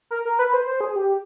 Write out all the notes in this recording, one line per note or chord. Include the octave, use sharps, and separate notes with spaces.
A#4
A#4
B4
C5
C5
G#4
G4